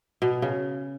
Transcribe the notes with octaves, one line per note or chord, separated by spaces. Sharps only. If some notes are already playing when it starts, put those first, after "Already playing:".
B2
C#3